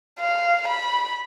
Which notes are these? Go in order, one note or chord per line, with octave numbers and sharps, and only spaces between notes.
F5
B5